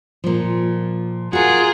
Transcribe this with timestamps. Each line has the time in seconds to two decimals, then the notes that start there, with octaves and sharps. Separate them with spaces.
0.24 A#2 F3
1.33 F4 F#4 G#4 A#4